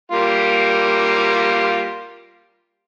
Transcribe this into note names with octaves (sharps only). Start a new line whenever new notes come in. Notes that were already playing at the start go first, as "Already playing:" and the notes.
G3 A#3 F4